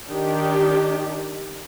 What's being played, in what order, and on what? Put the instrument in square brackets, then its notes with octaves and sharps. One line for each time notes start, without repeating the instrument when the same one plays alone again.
[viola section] D#3 D4 G4